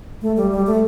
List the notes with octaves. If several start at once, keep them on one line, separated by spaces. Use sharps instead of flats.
A3
G3
G3
A3